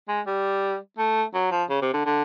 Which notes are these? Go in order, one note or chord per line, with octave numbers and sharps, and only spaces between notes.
G#3
G3
A3
F#3
F3
C#3
C3
D3
D3